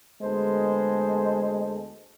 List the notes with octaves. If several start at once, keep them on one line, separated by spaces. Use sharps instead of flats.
D2 G#3 B3 G#4 A4 C5